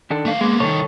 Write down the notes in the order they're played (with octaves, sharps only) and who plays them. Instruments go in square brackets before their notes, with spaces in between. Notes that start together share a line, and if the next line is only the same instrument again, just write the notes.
[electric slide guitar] D#3 D4 A4
[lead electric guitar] A3 F5
[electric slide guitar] G#3 [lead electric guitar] A#3 B3
[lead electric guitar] C2 D#3 [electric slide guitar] A4 C#5